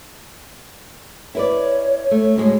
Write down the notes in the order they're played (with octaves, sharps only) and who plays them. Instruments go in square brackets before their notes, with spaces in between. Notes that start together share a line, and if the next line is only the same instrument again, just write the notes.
[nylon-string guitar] E4 B4 D5 [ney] C#5
[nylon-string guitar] A3
D2 A2 G#3